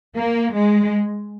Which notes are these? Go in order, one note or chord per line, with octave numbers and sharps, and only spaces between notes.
A#3
G#3